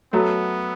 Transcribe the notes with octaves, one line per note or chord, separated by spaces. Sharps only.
F#3 A3 B3